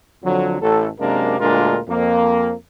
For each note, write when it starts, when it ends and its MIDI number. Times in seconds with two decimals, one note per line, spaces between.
0.24 0.60 41
0.24 0.60 50
0.24 0.60 53
0.24 0.60 54
0.61 0.88 33
0.61 0.88 69
1.00 1.38 42
1.00 1.38 48
1.00 1.38 56
1.00 1.38 58
1.00 1.38 62
1.00 1.38 70
1.40 1.80 38
1.40 1.80 46
1.40 1.80 56
1.40 1.80 62
1.40 1.80 65
1.40 1.80 70
1.89 2.52 41
1.89 2.52 58